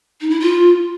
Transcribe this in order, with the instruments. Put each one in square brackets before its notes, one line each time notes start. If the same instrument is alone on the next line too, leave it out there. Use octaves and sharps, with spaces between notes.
[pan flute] D#4
E4
F4